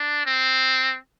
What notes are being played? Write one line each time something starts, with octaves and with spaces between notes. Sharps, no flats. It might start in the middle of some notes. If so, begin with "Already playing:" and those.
Already playing: D4
C4